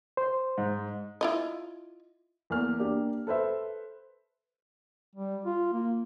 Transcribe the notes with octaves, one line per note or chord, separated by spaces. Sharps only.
C5
G#2
E4 F4 D#5
E2 A#3 F6
A#3 D4 G4
A4 B4 C5 E5
G3
F4
A#3